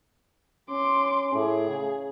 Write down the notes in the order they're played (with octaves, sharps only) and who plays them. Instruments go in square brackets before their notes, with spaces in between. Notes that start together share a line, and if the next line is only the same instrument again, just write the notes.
[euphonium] C#4 [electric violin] C6 D6
[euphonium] A2 [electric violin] G#4
[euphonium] C#3